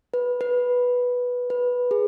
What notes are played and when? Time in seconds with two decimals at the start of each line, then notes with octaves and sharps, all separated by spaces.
0.14 B4
0.41 B4
1.50 B4
1.91 G#4